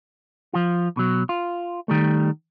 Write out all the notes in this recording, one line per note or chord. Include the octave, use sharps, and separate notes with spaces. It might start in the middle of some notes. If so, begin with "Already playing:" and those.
F3 F4
B2 F#3
F4
D#3 G3 A3